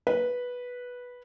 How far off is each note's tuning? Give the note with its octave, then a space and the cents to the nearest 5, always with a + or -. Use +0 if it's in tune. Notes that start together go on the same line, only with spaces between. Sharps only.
B4 -10